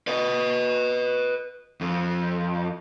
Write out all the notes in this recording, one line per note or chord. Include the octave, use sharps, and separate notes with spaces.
B4 D#5
F2